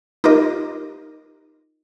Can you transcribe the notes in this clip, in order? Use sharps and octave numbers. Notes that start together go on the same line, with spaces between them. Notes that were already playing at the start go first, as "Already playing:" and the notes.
D#4 F4 G4 A#4 D#5